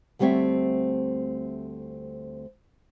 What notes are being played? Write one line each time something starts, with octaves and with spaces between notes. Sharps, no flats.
D2 G3 A3 C4 C#5 E5